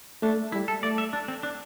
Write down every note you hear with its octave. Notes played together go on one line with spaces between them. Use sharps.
A3 D4
G3 E4
A4
A3 D5
E5
D4
C4
D4